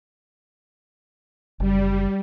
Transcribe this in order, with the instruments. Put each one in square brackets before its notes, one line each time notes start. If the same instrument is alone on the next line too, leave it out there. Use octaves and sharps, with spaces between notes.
[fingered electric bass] F#1 [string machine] G3